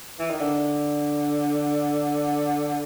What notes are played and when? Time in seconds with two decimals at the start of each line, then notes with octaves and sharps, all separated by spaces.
0.19 E3
0.30 D#3
0.40 D3